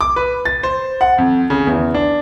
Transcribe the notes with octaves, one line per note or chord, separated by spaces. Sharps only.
D6
B4
A6
C5
F#5
F2
C#3
E2
D4